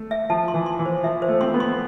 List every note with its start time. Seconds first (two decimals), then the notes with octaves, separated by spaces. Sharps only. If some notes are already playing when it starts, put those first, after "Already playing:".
Already playing: A3
0.11 E5
0.30 F3 A5
0.48 C6
0.54 E3
0.66 C6
0.79 E3
0.85 C5
1.03 F3 E5
1.22 C5
1.28 A3
1.41 C4 C6
1.54 B3
1.60 C6